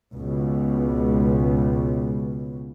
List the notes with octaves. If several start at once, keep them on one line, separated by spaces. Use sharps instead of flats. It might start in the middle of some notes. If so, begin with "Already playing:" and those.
C#2 B2